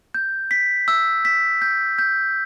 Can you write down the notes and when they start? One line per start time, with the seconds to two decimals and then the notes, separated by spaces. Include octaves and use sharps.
0.14 G6
0.51 B6
0.88 E6
1.25 B6
1.62 G6
1.99 G6